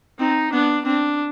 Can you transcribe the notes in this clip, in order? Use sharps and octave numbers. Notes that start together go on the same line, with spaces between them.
C4 D#4
B3 D4
C4 D4